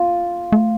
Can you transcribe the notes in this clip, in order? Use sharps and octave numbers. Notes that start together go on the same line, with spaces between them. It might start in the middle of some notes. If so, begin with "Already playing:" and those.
Already playing: F4
A3